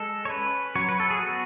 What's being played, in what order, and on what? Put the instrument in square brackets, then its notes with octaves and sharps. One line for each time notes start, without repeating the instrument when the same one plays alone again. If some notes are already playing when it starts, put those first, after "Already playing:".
Already playing: [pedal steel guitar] G#3 A4
C#5
C#4 B4
F#3 C#5
B4
A4
G#4
B3 F#4